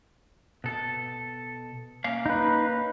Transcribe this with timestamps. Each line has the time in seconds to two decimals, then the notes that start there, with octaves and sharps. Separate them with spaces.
0.64 B2 A4
2.04 A#3 C#4 F5
2.26 D#4 B4